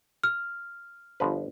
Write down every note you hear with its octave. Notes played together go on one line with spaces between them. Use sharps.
F6
G1 F3 B4